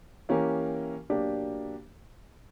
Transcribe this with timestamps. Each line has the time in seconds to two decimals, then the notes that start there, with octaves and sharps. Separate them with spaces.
0.29 E3 A#3 C#4 G4 A#4
1.09 B2 F#3 A#3 D4 G4